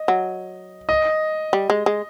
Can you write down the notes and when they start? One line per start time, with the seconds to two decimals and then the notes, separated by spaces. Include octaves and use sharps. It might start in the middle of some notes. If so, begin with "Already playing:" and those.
Already playing: D#5
0.08 F#3
0.89 D#5
1.53 G3
1.70 G#3
1.86 G#3